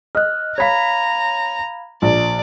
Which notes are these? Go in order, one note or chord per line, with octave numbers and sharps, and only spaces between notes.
D#5 F6 F#6
C#5 F5 A#5 B5 G#6 B6
A#1 D5